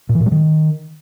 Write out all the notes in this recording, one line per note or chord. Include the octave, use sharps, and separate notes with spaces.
A#2
E3
A#2
G3
D#3